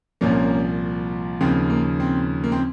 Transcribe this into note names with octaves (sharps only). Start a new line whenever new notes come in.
C2 A#2 F3 A#3 C#4
D#2 C#3 F3 C4
A#3
C4
A#3
C4